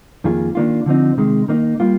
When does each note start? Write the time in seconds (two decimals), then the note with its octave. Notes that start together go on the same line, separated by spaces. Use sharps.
0.24 F2 D#3 A#3 F4 G#4
0.55 D#3 A#3 D4 F4
0.86 D3 F3 C4 D#4
1.17 C3 D#3 G#3
1.48 D#3 A#3 D#4
1.80 G3 A#3 F4